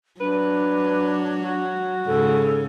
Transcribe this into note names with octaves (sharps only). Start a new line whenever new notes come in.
F#3 D4 B4
F#4
G#2 C#3 A4